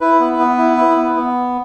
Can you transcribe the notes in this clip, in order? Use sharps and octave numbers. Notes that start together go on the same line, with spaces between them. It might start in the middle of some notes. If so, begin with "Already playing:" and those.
E4 B4
B3
B3
E4
E4
B3
B3